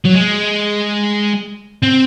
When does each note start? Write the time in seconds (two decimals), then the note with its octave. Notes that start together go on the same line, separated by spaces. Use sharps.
0.05 F#3
0.15 G#3
1.83 C4